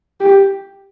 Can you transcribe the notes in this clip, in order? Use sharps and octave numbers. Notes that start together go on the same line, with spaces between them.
G4